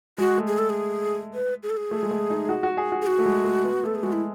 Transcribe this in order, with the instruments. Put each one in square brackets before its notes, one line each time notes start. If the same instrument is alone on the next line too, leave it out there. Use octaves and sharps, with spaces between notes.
[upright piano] G#3 [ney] F#4
[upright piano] A3
[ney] G#4
A4
G#4
B4
G#4
A4
G#4
[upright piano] A3
G#3
A3
D#4
F#4
F#4
G#4
F#4
[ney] G#4
F#4
[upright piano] A3
G#3
A3
B3
[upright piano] A3 [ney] A4
[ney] G#4
[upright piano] G#3 [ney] F#4
[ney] E4